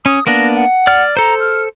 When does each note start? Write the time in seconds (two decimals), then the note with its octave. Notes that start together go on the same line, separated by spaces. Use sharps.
0.06 C#4 D#6
0.27 A#3 B3 D4 A#6
0.55 F#5
0.87 D5 F6
1.17 A4 C5 A#5
1.40 F6